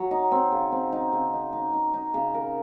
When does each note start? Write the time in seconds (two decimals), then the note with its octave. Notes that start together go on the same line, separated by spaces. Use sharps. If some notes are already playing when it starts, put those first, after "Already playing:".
Already playing: F#3
0.11 D#4
0.32 C4
0.52 C#3
0.72 C4
0.92 D#4
1.13 C#3
1.33 D#4
1.53 D#4
1.73 D#4
1.94 D#4
2.14 C#3
2.34 A#4